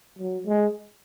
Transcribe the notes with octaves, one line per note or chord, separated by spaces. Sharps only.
F#3
G#3